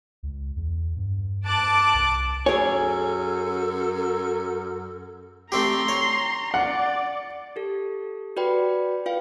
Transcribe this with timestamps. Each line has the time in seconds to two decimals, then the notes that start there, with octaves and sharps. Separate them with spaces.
0.23 C#2
0.56 E2
0.97 G2
1.45 A5 D6 F#6
1.94 C2
2.46 F#2 G#4 A4 C#5 G#5
5.52 A3 C4 G4 A#5 C6
5.88 C#5
6.54 D5 F#5
7.56 G4 A4
8.37 F#4 B4 D5 G5 B5
9.06 F4 B4 F5 G5